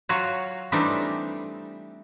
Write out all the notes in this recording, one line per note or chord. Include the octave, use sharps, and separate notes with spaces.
F#3 F4 F#4 C#5
E3 G3 A3 C4 D4 D#4